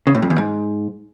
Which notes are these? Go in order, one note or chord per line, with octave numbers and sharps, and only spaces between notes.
C#3
A2
F2
E2
G#2